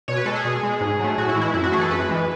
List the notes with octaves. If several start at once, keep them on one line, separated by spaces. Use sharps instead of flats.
B2 C#5
B4
G#3 A4
G#4
B2
G#3
G#2
F#3 A3
A2 F#4
E4
E3 G#3
E4
F#2 E4
F#4
E3 A3 G#4
A4
F#2 B4
E3 G#3